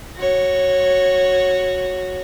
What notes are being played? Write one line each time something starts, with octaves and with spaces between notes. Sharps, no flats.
F#4 C#5